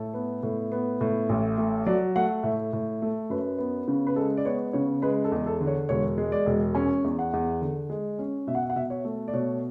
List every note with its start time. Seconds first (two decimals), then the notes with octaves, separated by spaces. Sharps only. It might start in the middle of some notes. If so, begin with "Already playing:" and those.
Already playing: A2 A4
0.14 B3
0.43 A2
0.72 B3
1.01 A2
1.29 A1
1.58 A3
1.86 F#3 D5
2.16 A3 F#5
2.43 A2 E5
2.73 A2
3.02 A3
3.30 F#2 B4
3.59 B3
3.87 C#3
4.07 B4
4.16 G#3 A4
4.37 D5
4.45 B3 C#5
4.73 C#3 C#5
5.02 G#3 B4
5.24 A4
5.32 E2
5.46 A4
5.61 D3
5.67 C#5
5.89 E1 C#5
6.18 G#3
6.32 D5
6.46 E1
6.75 C#4 G#5
7.04 E2
7.19 F#5
7.33 E2
7.62 D3
7.90 G#3
8.19 C#4
8.47 B2 E5
8.55 F#5
8.62 E5
8.70 F#5
8.76 B2 E5
8.90 C#5
9.05 A3
9.28 D5
9.33 B2 C#5